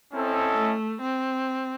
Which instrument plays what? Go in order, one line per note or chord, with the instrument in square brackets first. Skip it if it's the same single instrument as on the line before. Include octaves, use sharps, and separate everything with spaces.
[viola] C4 [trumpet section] C#4 E4 A4 D#5
[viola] A3
C4